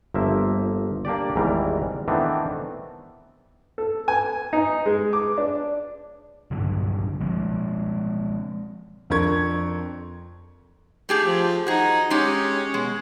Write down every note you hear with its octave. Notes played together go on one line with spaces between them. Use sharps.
G1 F3 A#3 E5
A#3 D4 G4 D5
G#1 E2 G#2 E3 G3 A#4
D#3 E3 A3 B3 C4 D4
A4
G#5
D#4
G#3
D6
D4
A#1 G2 D3 F#3
F3 G#3 C4
F2 D4 A#4 C#6 G#6
A3 G4 G#4
F3
D#4 F#4 G#4
G#3 C#4 D#4 G4
B2 G#3